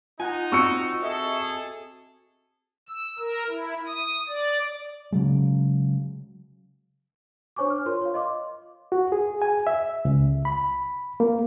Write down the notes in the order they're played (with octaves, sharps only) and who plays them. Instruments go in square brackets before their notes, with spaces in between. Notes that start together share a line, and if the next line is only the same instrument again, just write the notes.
[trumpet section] D#4 [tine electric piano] F4 F#5 [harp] G#5
[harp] C4 F#4 [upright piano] C#6 E6 C#7
[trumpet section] G#4 A4 [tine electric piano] D#5 E5
[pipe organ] E6
A#4
E4
D#6
D5
[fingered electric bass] C#3 F#3 G#3
[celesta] D4 C5 C#5 G#5 C#6 D6
F6
F4 A#4 C#5 C6
C#5 F5
D#5 C6 D6
[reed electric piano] F#4
G#4
G#5
E5
C#2
B5
A#3